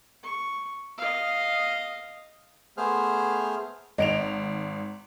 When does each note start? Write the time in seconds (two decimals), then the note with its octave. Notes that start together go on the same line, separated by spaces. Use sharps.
0.23 C#6
0.98 D#5 F5
2.77 A3 B3 G#4 C5 F6
3.98 G#1 C#5 D#5 D7 F7